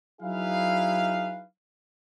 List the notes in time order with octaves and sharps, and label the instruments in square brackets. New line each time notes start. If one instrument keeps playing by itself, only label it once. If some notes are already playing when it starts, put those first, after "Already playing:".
[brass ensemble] F#3 D#4 E4 G#4 B4 F5